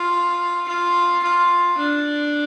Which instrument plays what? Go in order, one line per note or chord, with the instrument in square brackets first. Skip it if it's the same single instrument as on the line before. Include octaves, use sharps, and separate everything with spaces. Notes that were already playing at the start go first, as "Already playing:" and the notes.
Already playing: [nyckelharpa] F4
F4
F4
D4